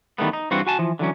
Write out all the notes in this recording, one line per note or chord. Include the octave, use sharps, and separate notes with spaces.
E2 D#3 G3 A3 B3
D#4
G2 E3 C4 F4 F#4
F#4 G#5 A5
E3 F3
D3 E3 F#3 C#4